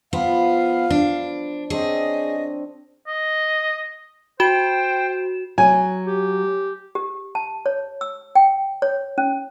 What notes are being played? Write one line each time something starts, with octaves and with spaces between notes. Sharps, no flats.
F3 B3 F4 F5 B5
D4
C4 D4 G#4 C#5 D#5
D#5
F#4 C5 G5 E7
F#3 G#5
G4
G4
A5
C#5
E6
G5
C#5
C#4